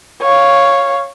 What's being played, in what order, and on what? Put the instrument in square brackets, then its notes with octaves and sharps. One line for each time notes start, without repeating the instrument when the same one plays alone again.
[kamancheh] C#5 F5